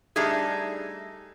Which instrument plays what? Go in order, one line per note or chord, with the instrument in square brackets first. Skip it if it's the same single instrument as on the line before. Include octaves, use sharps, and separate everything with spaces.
[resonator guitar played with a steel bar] G3 A3 D4 D#4 G4 G#4